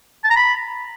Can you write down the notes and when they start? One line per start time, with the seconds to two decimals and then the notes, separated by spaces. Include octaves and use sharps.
0.24 A5
0.30 A#5
0.36 B5